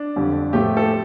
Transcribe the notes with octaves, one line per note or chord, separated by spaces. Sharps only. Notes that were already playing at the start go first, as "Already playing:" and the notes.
Already playing: D4
F2 D3 G3
A2 F3 A3 G4
A4